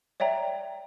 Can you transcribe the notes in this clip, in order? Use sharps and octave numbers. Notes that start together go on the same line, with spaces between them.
C#5 D5 E5 G5 A#5